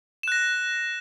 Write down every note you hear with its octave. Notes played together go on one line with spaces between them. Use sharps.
F#6 A#6 E7